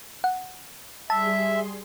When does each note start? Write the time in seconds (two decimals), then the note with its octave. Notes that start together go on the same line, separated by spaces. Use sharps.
0.24 F#5
1.10 G3 G#4 E5 A5 C6